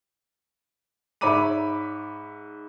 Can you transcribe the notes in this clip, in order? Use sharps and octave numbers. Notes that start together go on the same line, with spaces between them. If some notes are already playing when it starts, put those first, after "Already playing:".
G#2 C#5 E5 B5 D6 D#7